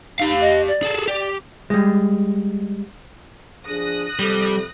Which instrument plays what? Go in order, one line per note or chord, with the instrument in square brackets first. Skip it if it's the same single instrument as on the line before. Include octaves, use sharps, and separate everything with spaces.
[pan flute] D#4 [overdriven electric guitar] G4 F5
[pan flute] D#5
D5
[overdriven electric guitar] G#4 A4
[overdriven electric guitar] G4 [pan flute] D5
[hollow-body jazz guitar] G3 G#3
[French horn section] F3 D4 G#4 [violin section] D#6 F#6 A#6
[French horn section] C3 F3 A4 [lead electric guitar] G3